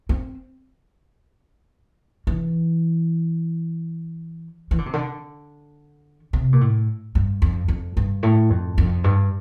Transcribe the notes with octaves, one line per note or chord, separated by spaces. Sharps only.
C4
E3
E3
D3
C3
D3
C3
A#2
A2
G2
F2
F2
G2
A2
F2
F2
G2